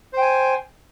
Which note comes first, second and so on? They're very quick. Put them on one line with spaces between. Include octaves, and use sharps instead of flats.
C5 G5 G#5